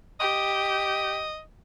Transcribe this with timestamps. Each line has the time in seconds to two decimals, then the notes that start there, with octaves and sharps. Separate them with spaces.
0.20 G4 D#5